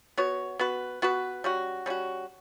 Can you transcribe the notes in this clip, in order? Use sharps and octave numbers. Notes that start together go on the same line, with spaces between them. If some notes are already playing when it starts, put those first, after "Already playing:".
B3 F#4 C#5
B3 F#4 B4
B3 F#4 B4
G3 C#4 F#4
G3 C#4 F#4